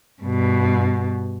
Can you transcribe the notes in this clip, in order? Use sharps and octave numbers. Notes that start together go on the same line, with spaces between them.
G2 B2